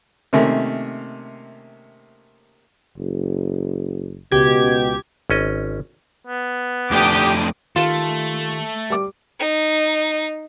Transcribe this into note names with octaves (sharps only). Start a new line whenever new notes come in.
C3 D#3 A3 A#3 C#4
F#1
C#2 B2 G4 G#6
G#1 C#4 D#5
B3
F2 A3 D4 G4 D6 D#6
D#3 A3 F4 G4 F5 E7
G3 D6
D#4